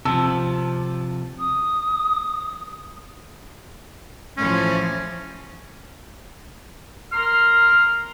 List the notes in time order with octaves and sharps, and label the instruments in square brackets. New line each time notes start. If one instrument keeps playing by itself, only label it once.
[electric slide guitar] C3 F3 [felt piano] A5 E6
[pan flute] D#6
[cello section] A2 E3 F3 [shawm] C#4
[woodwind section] A#4 C6 F6